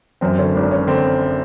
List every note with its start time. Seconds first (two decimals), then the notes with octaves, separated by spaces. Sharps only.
0.21 F#2 C4
0.38 D3 C#4
0.55 G#1 D4
0.71 G#1 C#4
0.87 D3 C4